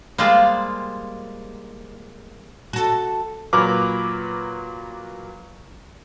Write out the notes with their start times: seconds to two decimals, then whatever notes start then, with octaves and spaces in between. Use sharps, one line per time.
0.18 G3 G#3 A#3 F4 C5
2.73 F#4 A4
3.53 A#2 F#3 A#4 B4 D6